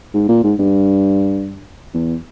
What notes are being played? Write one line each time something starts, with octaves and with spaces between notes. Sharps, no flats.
G#2
A#2
G#2
G2
E2